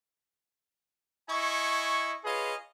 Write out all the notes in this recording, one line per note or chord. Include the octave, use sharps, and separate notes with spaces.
E4 D#5 G#5 C#6
F4 G#4 B4 C#5 D#5 F5